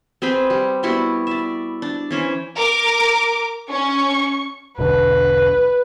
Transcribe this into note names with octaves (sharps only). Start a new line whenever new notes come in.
C4 G#4 B4 G5
G3
G3 B3 E4 F#4
D5 E5
D4
E3 C#4 C5
A#4 D6
C#4 C#6
E1 B1 D3 B4